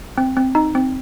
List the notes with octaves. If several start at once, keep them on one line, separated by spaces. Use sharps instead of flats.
C4
C4
D#4
C4